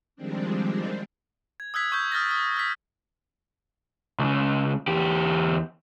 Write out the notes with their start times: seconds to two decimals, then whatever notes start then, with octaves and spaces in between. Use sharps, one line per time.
0.16 D#3 F3 G3 G#3 C4 D4
1.60 G#6
1.74 D#6 E6 F#6 G#6 B6
1.92 C#6 E6 G6 G#6
2.12 D#6 F6 A6 A#6
2.31 D#6
2.57 E6 B6
4.19 C#2 C#3
4.88 E2 G4